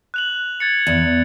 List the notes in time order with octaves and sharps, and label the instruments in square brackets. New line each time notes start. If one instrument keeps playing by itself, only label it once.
[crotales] F#6 F7 F#7
G#6 A6 C#7
[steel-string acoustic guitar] E2